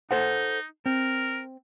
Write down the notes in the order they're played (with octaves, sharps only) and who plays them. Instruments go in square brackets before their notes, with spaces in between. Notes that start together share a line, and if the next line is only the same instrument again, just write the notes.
[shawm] D#4 [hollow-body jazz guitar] A4 C5 F#5
[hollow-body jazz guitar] C4 [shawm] A#4